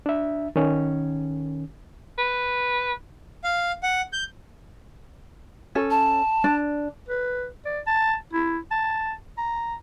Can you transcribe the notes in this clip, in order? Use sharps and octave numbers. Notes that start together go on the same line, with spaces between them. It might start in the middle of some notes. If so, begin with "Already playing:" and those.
D4 E5
D#3 C#4
B4
F5
F#5
G6
C#4 A4
A5
D4
B4
D5
A5
E4
A5
A#5